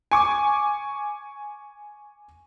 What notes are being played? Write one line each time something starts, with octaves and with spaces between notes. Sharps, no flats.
G#5 C#6 D6